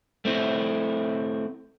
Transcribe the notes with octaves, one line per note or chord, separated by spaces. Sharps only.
A3 C4 E4